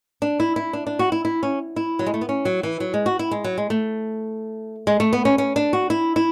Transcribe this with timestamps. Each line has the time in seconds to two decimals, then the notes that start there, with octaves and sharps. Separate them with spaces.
0.22 D4
0.40 E4
0.56 E4
0.73 D4
0.87 D4
0.99 F#4
1.12 E4
1.25 E4
1.43 C#4
1.76 E4
1.99 F#3
2.06 G#3
2.14 A3
2.21 B3
2.29 C#4
2.45 F#3
2.63 E3
2.80 F#3
2.94 G#3
3.06 F#4
3.19 E4
3.31 G#3
3.44 F#3
3.58 G#3
3.70 A3
4.87 G#3
5.00 A3
5.13 B3
5.25 C#4
5.38 C#4
5.56 D4
5.73 F#4
5.90 E4
6.16 E4